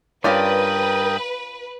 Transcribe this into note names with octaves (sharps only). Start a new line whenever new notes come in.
G2 C#4 F4 A#4 B4 D5 G5 D#6